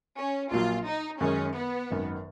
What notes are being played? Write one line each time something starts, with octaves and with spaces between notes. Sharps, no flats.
C#4
A#1 A#2 F#3 F4
D#4
F#2 D#3 G#3 C#4 D#4 G#4
B3
G#1 F#2 D#3